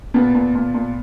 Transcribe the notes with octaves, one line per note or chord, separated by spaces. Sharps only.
A#2 B3
A#2
A#2
A#2